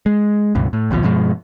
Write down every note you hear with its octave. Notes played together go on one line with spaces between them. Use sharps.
G#3
C#2 G2 B2
A2
A#1 D#2 B2 F3
G2 B2 F3 G#3